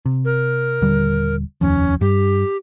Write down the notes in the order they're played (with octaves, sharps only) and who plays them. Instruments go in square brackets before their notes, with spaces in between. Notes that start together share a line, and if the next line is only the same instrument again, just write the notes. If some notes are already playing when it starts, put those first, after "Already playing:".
[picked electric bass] C3
[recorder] A#4
[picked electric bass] D#1 D3 G3
[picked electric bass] F1 D#2 F3 [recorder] C#4
[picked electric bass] G2 G3 [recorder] G4